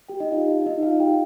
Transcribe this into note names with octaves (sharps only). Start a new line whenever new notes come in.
G4 G5
D#4 D#5
F4 F5
D#4 D#5
F4 F5
G4 G5